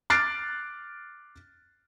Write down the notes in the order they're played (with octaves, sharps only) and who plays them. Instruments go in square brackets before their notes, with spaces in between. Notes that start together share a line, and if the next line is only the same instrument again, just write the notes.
[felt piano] D6 F6 F#6 A6 C7 D7